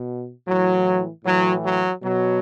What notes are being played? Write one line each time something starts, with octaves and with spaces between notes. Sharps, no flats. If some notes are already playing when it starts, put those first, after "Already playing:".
Already playing: B2
A2 E3 F#3
A2 E3 F#3
F#3
B2 F#3